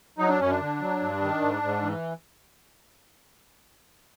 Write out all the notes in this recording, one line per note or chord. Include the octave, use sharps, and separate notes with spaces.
F#3 D#4
D4
F#2 C#4
D4
D3
F#3
G2
D#3
G#2
G#2
E3